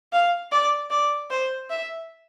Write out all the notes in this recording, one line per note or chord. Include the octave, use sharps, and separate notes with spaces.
F5
D5
D5
C5
E5